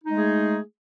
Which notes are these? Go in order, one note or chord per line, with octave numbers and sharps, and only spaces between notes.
G#3 A3 D#4 G#4